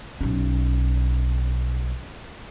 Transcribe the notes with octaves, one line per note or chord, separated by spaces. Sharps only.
B1 C#4